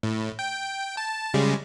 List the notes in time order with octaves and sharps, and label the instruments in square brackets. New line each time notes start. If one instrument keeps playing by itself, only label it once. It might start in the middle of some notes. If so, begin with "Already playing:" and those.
[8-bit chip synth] A2
G5
A5
C#3 G3 G#3